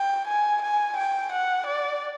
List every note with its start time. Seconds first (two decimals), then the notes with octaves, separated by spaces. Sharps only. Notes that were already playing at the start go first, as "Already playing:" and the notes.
Already playing: G5
0.28 G#5
0.62 G#5
0.97 G5
1.32 F#5
1.67 D5